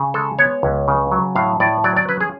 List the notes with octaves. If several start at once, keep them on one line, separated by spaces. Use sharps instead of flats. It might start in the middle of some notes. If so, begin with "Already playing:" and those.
Already playing: C#3
G#3 A4
B3 C#5
C#2
C#3
F#3
A2 F5
A2 D5
F#3 D5
D5
C#4 B4
G#4